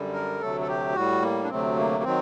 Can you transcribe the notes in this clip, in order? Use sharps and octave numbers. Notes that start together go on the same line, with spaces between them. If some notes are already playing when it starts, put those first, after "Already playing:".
Already playing: F#2 D3 G3
A#4
D2 C3 F#3 A3 A4
A4
G4
A2 G3 F#4
A#3
D4
D2 C3 F#3 A3 C4
A#3
D#3 F#3 C4